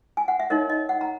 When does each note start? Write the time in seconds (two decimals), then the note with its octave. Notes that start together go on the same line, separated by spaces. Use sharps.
0.17 G#5
0.28 F#5
0.40 E5
0.50 D#4 A#4 C#5 D#5
0.70 D#5
0.89 F#5
1.01 A#5